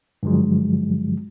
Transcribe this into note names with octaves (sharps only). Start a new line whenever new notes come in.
G2 D3 F3 F#3 G#3